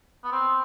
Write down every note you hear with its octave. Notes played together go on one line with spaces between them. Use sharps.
B3
C4